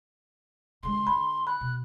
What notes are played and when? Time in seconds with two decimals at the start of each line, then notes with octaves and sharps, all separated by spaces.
0.83 D3 G#3 C6
1.07 D3 B5
1.47 B5 F#6
1.61 B2